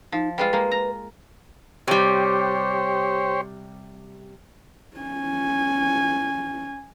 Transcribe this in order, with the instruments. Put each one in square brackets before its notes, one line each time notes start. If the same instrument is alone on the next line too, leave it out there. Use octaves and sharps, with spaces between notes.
[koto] F3 [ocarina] D#4
[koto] G3 G#3 F4 [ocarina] B4
[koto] G#3 A#3
A#5
[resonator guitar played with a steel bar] C3 G3 [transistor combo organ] G4 C5 C#5
[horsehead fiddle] C#4 G#5